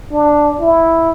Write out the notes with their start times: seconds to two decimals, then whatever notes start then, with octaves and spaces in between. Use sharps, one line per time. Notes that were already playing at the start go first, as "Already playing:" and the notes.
0.11 D4
0.60 E4